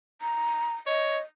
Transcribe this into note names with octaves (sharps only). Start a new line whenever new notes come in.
A#5
C#5 D#5